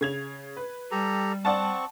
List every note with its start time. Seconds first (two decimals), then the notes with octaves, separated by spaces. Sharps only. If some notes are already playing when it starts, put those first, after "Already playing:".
0.01 C#3 G#6 F7
0.57 B4
0.91 G3 G4 A4 A#5
1.45 C4 D5 F#5 A5 C#6